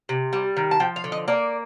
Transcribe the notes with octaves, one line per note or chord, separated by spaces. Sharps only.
C3
G3
D#3
A5
F3 G5
F5
D3
D#5
A#3 D5